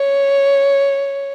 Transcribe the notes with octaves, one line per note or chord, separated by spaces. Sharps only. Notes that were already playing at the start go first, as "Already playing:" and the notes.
Already playing: C#5